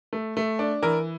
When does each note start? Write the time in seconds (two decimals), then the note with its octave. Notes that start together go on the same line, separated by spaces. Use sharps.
0.13 A3
0.37 A3
0.59 D4
0.82 E3 A#4